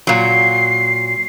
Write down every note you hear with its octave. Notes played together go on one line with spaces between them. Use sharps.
A#2 F#3 C7